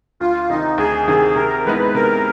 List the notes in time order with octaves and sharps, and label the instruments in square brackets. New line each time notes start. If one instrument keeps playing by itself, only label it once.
[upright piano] D2 [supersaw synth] F4
[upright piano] C3 D#3 [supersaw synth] D#4
[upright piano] D2 [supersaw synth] G#4
[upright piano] C3 D#3 [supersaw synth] G#4
[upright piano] C3 [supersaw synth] A#4
[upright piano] E3 G#3 B3 D#4 [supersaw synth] B4
[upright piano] C3 [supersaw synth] A#4